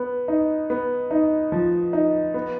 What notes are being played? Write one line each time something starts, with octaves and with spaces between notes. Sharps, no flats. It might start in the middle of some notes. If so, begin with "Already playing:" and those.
Already playing: B3
D#4
B3
D#4
F3
D#4
B3